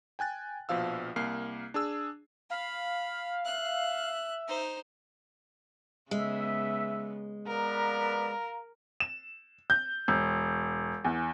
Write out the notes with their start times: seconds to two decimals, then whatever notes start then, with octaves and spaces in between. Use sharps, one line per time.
0.19 G5 G#5 F#6 A6
0.69 A#1 B2 F3 F5 E6
1.16 C2 A#3 F6 C7
1.74 D4 G#4 E6
2.50 F5 B5
3.45 E5 F#6
4.48 D#4 C5
6.11 C#3 G#3 B3 E5
7.47 B3 A#4 B4 D5 F5 A#5
9.00 E7
9.70 G6
10.08 E1
11.05 E2